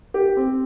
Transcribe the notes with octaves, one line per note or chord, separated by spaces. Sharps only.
G4
C4